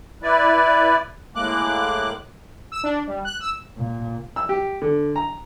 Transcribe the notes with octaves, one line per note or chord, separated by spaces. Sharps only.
E4 B4 D5
A2 G#3 A#3 D6 F#6
E6
D4
G3
F#6
E6
A#2
E6
G4
D3
A#5